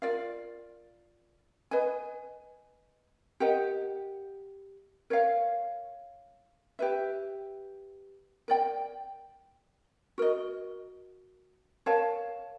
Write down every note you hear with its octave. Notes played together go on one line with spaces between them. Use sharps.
F4 A#4 D5 F5
B4 D#5 G#5
G4 A#4 D#5 F#5
A#4 C#5 F5
G4 B4 E5
A#4 D5 G5
F#4 A#4 D#5
A#4 C#5 F5 A5